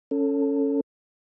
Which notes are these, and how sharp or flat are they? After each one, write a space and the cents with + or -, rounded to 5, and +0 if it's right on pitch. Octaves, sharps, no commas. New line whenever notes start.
C#4 +0 A4 +15